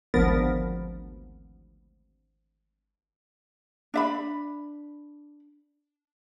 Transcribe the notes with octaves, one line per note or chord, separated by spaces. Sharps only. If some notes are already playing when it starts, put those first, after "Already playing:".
G#1 D2 F3 B3 A#4 A6
D4 E5 B5